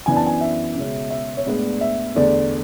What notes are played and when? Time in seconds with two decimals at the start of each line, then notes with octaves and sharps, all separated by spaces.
0.06 F#2 E3 B3 D4 G#5
0.16 A5
0.26 G#5
0.41 E5
0.76 C#2 B2 G#3 C#4
1.10 E5
1.37 C#5
1.46 A2 G#3 B3 D4 D5
1.81 E5
2.15 E2 D3 A3 D4 D5